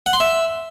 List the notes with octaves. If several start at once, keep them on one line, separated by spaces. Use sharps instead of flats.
F#5
C6
E5